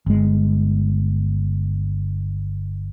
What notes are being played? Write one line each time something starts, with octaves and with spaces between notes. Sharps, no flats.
G1 G#3